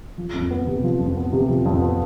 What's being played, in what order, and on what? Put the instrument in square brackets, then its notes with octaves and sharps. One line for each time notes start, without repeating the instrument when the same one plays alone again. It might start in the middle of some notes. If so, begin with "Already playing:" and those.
[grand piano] F3
F2
B3
C3
F3
F2
B3
C3
F3
F2
B3